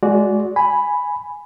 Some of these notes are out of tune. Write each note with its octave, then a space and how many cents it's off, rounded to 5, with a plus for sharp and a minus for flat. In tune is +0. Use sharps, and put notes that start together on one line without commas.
G#3 +10 F#4 -5 D5 -15
G#5 +0 B5 +0